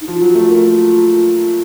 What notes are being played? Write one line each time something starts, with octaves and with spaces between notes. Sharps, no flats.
D#4
F3 F4
F#3
A3
A#3